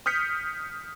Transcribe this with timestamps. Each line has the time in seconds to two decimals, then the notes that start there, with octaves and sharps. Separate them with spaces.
0.06 D#6 F6 G6 B6 C#7